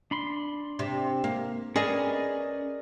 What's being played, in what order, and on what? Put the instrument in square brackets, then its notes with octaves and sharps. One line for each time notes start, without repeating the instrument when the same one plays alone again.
[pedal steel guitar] D4 B5 C6
[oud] C3
A#3
[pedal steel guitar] C#4 B4 G#5 [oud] G#4 [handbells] A#4 D5 D#5